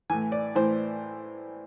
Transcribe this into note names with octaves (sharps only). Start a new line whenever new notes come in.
A2 E3 G#5
D5
A2 E3 C5